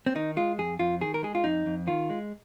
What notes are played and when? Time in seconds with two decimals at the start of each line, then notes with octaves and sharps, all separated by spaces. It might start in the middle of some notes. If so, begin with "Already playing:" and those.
0.06 C4
0.15 D#3 D#4
0.37 G#3 F4
0.58 F2 G#4
0.79 F2 F4
1.01 D#3 G#4
1.14 A#4
1.23 G#3 G#4
1.35 F4
1.44 F2 D#4
1.66 F2
1.88 D#3 F4
2.10 G#3